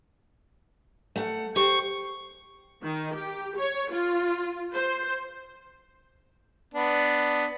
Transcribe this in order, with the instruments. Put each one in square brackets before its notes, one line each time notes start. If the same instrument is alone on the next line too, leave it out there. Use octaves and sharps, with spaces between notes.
[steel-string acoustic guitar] A3 F#5
[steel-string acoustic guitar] G4 C5 [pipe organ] C#6
[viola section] D#3
G4
C#5
F4
C5
[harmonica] B3 D4